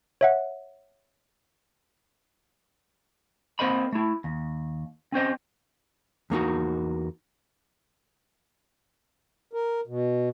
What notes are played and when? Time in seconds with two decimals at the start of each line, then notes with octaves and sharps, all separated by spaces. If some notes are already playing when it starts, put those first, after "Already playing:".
0.21 C#5 E5 F#5
3.59 A#3 C4 A#4 C5 D#5 B5
3.93 A3 E4
4.24 D#2
5.12 C4 C#4 C5 D#5
6.30 E2 A#3 D#4 F#4
9.53 A#4
9.87 B2